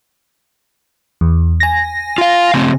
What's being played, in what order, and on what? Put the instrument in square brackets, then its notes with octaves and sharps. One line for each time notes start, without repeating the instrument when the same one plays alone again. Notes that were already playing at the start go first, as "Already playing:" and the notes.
[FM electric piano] E2
G#5 A#6
[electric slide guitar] F4 F5
C#3 A3 C4